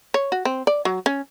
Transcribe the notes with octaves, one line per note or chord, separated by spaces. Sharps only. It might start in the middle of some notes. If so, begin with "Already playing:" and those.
C#5
F#4
C4
D5
F#3
C#4